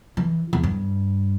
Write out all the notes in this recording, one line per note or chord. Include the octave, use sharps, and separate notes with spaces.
E3
E2
G2